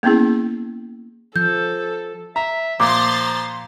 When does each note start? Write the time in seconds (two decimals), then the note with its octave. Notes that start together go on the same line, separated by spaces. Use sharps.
0.03 A#3 B3 C#4 E4 G#4
1.36 F3 A4 G6
2.36 E5 A#5
2.80 A#2 F3 A#5 C6 D6 A6